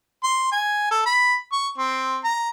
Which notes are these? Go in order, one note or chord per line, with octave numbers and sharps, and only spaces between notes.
C6
G#5
A4
B5
C#6
C4
A#5